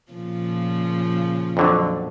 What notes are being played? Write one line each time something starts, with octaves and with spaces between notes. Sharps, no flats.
A#2 C#3 F3
F2 D3 F#3